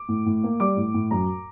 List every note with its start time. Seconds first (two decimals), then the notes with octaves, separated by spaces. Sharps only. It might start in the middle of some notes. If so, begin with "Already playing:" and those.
Already playing: D6
0.08 A2
0.26 A2
0.44 A#3
0.60 G3 D6
0.77 A2
0.94 A2
1.11 F#2 A#5